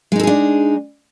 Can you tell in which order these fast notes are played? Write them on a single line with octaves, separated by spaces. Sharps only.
G#3 D#4 A4 G#4 D4